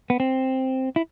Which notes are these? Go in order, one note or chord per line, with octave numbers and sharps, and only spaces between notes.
B3
C4
E4